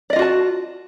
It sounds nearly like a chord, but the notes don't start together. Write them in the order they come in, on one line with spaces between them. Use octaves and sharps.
D5 D#5 F4 F#4 A5